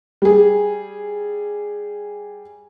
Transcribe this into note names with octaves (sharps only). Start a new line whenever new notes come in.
G3 G#4